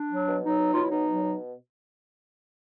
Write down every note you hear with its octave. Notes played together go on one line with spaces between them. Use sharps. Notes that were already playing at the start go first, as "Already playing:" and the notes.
Already playing: D4
F#3
B2
F#3 D#4
B2
F#3 F4
E4
B2 D#4
F#3
B2